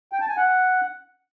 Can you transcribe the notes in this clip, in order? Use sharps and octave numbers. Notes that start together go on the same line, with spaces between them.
G5
A5
G#5
F#5